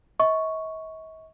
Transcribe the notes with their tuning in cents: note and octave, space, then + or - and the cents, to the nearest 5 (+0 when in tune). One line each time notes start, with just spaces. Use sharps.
D#5 +45 C#6 +0